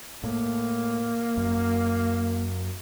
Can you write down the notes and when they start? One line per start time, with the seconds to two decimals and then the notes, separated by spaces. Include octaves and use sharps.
0.24 A2 A#3
1.37 F#2